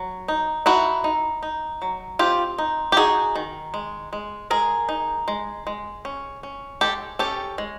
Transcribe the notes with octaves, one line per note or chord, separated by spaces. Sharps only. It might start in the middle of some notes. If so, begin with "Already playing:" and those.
Already playing: F#3
D#4
D#4 E4 F#4
D#4
D#4
F#3
C4 F4 G4
D#4
G4
D#4 F#4 G#4
D#3
G#3
G#3
G#3 G#4 A#4
D#4
G#3
G#3
C#4
C#4
G#3 G4 A4
C#4 G4 A4
G#3